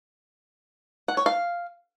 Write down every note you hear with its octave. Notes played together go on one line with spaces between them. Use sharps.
F#5
C#5
F5